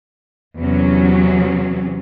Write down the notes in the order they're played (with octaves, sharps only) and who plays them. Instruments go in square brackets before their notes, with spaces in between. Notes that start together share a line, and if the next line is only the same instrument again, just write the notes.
[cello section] E2 C3 F#3 C#4